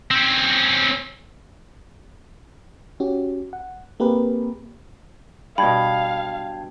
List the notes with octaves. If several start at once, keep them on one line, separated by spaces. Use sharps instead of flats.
C4 C#4
C#4 F#4 G4
F#5
A#3 C4 G4 G#4 A#4 B4
G2 B2 F5 G5 A5 B5 G#6